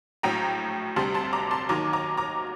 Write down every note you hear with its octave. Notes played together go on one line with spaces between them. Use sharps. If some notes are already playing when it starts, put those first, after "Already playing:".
A#1 A2 F#3 G5 A#5
D2 C3 G3 A5 C6
A5 C6
A#5 D6
A5 C6
D#2 D#3 F#3 A#5 D6
A#5 D6
A#5 D6